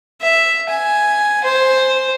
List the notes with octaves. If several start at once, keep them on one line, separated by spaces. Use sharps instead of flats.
E5
G#5
C5